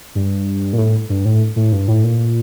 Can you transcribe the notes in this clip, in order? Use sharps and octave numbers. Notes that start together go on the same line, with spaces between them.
G2
A#2
A2
G2
A2
A2
G2
A2
A#2